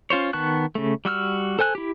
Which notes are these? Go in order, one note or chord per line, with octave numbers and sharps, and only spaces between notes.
C#4 F4 C5 C#5
D#3 B3 A5 C#6 F#6
C#3 A3
G3 F#4 E6 F6
A4 C5 G#5 F#6
E4 G4